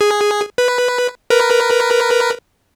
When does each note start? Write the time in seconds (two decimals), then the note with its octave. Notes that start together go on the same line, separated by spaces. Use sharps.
0.01 G#4
0.58 B4
1.30 A#4 B4